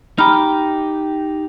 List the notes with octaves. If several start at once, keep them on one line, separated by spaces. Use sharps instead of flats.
D#4 G4 A#5 B5 F6